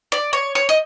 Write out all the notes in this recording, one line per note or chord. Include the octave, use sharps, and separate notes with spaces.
D5
C#5
C#5
D#5